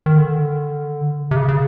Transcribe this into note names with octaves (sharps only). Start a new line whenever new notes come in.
D#3
D3
C3
C#3
C#3